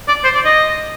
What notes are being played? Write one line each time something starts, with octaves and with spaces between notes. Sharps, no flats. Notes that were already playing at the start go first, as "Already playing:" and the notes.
D5
C5
D5
D#5